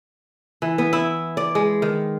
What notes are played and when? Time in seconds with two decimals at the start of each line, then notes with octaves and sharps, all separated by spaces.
0.62 E3
0.78 B3
0.93 E4
1.37 D5
1.55 G#3
1.82 D#3